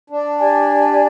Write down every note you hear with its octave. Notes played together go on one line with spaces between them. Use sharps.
D4
G4 D5 G#5